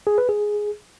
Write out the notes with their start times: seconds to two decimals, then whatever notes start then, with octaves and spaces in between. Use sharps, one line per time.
0.07 G#4
0.18 B4
0.29 G#4